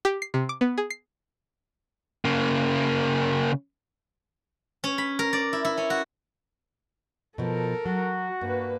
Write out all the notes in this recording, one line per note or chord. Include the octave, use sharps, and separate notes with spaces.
G4
C7
C3
D6
B3
G#4
C7
C#3 A#3
C#4
B5
A#4
D5
E4
E4
C#4
F#4
B2 F3 A4 A#4
F#3 F#4
G2 A#3 B4